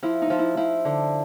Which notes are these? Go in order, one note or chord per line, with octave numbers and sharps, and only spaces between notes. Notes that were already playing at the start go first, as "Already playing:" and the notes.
F3 E4
D#4
F3
E4
F3 E4
D3